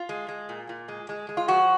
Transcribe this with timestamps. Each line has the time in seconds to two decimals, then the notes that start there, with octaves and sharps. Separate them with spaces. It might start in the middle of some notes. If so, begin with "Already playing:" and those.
Already playing: F4
0.09 G#3
0.28 G#3
0.49 A#2
0.69 A#2
0.88 G#3
1.09 G#3
1.29 G#3
1.37 F4
1.48 F3 F#4